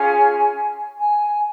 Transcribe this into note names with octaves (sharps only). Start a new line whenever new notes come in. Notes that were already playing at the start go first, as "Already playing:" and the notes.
Already playing: C#4 F4 G#4 G#5
G#5